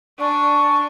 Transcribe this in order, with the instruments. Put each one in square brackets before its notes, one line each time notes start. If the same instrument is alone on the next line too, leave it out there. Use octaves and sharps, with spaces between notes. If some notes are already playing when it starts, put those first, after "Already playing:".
[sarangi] D4 [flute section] G#5 A5 C#6